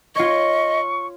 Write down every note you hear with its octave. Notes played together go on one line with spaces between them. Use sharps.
F4 C#5 D#5 C#6